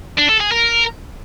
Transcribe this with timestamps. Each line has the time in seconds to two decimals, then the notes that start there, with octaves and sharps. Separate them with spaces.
0.18 D4
0.29 A4
0.41 G#4
0.52 A#4